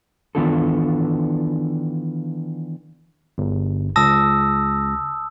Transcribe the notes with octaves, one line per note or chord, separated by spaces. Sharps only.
D#3 E3 B3 D4 F4 A4
G1
C#2 A5 D#6 E6 A#6